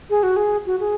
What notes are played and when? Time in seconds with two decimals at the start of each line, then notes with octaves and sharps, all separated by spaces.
0.10 G#4
0.23 F#4
0.36 G#4
0.66 F#4
0.80 G#4